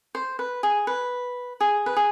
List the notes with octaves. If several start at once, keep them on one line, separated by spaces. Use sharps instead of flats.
C5
B4
G#4
B4
G#4
B4
G#4